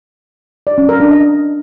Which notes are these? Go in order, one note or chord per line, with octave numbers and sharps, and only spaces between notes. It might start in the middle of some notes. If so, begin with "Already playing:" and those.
D5
C#4
A#4
D4
D#5